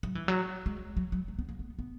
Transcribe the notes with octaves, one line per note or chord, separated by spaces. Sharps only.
F#3
E3
F#3
G#3
F#3
F#3
G#3
B3
A#3
B3
B3